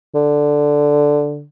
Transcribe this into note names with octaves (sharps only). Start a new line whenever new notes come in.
D3